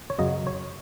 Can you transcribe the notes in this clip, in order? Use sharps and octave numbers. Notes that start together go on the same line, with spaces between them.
C#5
F#2 C#3 F#3 D#5
C#5